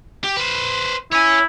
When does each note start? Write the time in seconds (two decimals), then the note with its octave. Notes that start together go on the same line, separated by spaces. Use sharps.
0.24 G4
0.37 B4 C5
1.12 E4 C#5 G#5